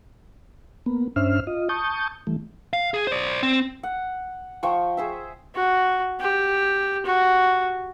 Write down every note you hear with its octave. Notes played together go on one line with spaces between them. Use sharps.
A#3 B3
G2 C#4 D4 C5 E5 F6
F4 D#5
A5 C#6 D#6 G6
E3 G3 A3
F5
G#4
C5 D5
C4
F#5
F3 G5 C#6
G#4 C5 E5
F#4
G4
F#4